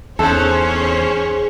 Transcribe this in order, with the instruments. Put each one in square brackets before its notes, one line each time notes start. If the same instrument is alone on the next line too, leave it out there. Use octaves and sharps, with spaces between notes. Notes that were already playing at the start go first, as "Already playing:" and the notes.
[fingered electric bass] E2 [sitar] G#2 [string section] C#4 C5 C#5 [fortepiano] A4